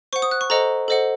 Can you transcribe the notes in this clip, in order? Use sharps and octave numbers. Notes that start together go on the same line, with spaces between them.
C5 F#5 C#6
D#6
F#6
C#6
A4 C5 D#5 F#5 A#5
A4 C5 D#5 F#5